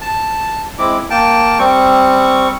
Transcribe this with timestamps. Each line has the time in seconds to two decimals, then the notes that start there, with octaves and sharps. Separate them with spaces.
0.01 A5
0.79 G#3 C4 E4 D6
1.10 A#3 G5 A5
1.59 G3 C4 C#6